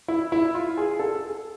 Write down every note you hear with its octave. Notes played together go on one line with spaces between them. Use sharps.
E4
E4
F4
G#4
A4